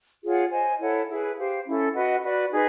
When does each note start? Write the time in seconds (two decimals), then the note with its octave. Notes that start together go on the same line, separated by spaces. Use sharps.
0.23 F4 G#4 C#5 F#5
0.51 C5 D#5 G#5
0.79 E4 A4 C#5 F#5
1.08 E4 G#4 B4
1.36 G4 C5 F5
1.65 C#4 E4 A4
1.94 F#4 B4 D#5 F#5
2.23 F#4 B4 D5
2.51 D#4 G#4 B4